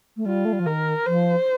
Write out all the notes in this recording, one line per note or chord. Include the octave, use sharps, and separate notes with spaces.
A3
G3 F4
A3
G3
F3
D#3 A#4
F3 C5